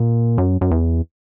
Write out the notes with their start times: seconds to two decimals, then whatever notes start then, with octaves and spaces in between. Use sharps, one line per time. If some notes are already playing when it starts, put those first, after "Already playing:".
Already playing: A#2
0.38 F#2
0.61 F#2
0.71 E2